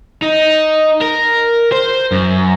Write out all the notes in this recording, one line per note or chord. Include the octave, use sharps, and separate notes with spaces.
D#4
A#4
C5
F#2